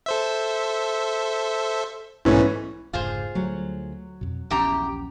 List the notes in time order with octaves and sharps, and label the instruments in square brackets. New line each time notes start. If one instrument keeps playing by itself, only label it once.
[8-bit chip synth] A4 C5 E5
[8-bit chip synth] B1 G#2 A3 [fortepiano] E3 B3 C#4
[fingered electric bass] F1 C#2 G#2 [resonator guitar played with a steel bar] F4 G#4 C5
[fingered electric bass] D2 A3 [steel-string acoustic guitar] F#3
[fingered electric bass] F2 B2
[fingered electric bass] D#1 A#1 C#4 [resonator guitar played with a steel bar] E2 G4 A#5